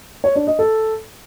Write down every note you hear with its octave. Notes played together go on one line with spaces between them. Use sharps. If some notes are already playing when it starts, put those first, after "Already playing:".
C#5
D4
D#5
A4